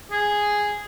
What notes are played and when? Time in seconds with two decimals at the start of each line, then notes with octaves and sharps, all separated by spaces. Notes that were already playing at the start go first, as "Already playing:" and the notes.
0.11 G#4